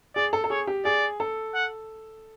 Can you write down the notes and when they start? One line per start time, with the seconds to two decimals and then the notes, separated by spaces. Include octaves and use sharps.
0.15 G#4 D5
0.33 A4
0.44 A4
0.50 G#4 C#5
0.67 G4
0.85 G#4 D5
1.20 A4
1.54 F#5